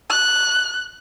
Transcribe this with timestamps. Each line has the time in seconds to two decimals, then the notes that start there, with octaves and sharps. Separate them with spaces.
0.10 F#6